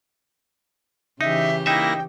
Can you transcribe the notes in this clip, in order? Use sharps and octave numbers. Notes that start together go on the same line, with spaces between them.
C#3 E3 D#4 G4 E5
A#3 D#4 E4 E5 G5 A#6